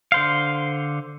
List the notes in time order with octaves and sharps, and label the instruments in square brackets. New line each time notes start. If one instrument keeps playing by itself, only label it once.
[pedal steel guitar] D3 C5 F5